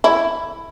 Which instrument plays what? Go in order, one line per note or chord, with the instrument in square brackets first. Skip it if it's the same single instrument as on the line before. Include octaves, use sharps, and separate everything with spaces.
[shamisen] E4